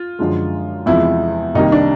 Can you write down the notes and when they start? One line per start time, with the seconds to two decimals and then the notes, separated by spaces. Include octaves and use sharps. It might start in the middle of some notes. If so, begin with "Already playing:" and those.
Already playing: F4
0.19 F#2 D3 F3 G#3
0.86 E2 C3 F3 G#3 E4
1.55 C2 C3 D#3 G3 A#3 D#4
1.72 D4